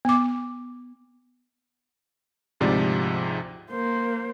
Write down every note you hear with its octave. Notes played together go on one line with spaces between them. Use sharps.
B3 D6
D2 G#2 C3 F3 D5
A#3 C5